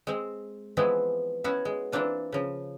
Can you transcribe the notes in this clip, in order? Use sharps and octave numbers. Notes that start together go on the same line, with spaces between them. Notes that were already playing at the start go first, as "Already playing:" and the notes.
G#3 C4
E3 F3 G#3 B3 C4 G#4
B3 C#4 E4 F#4 C#5
G#3
E3 A#3 C4 D4 F4
C#3 F3